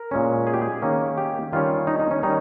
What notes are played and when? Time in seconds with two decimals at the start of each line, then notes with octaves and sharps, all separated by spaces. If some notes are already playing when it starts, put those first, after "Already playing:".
Already playing: A#4
0.11 A#2 G#3 C#4
0.47 G#4
0.54 G4
0.62 G#4
0.82 D#3 A#3 C#4
1.18 G4
1.53 D#3 G3 C#4 F4
1.87 D#4
1.99 D#4
2.11 C#4
2.23 D#3 G3 C#4 D#4